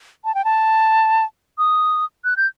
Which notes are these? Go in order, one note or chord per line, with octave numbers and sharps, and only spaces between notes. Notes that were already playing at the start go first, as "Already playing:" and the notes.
A5
G5
A5
D#6
F#6
G6